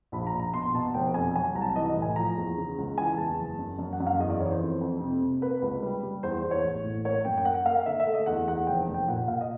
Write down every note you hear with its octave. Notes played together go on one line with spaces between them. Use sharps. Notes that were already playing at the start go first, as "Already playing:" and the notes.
A#1 B5
A#5
A#1
A#5
B2 C6
B2 A5
F1 G5
F2 G#5
F#3 G#5
C2 A#5
A5
E3 D#5
D#5
A2
G#5
F3 A#5
E2
C#3
C#2
E3 G#5
E2 A5
F#1
F#2
F#2
F#5
F#2
F5
E2 D#5
D5
E3 C#5
C5
F2
F2
C3
C3
A#3 B4
C#2 B4
G3
G3
E2 C5
C5
E2
C#5
A1
A2
A#3 C#5
F#2 G5
G5
A#3 F#5
A#3 F5
D3 E5
E5
A3
D#5
E2 F#5
E2 F#5
F1 G5
F1
G5
A#2 F#5
A#2 F5
D#5